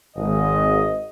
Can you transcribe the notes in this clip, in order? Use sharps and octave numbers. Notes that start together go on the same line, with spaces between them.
G#1 D#5